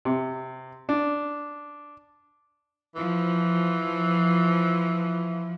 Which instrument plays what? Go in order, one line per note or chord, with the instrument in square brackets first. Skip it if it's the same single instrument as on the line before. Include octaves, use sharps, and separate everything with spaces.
[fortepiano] C3
D4
[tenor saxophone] E3 [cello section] F3